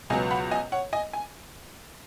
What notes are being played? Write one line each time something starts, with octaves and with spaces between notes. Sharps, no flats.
C#2 B2 F#3 B3 D#5 G#5
F#5 B5
D#5 G#5
C#5 F#5
D#5 G#5
G#5